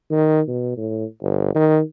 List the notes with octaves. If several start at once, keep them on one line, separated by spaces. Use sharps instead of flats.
D#3
B2
A2
G1
D#3